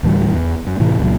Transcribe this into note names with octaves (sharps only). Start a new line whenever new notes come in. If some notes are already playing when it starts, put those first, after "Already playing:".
D2 A2 E3 G3
E2
F#2
A2 C3 E3
C#2 A#2 F#3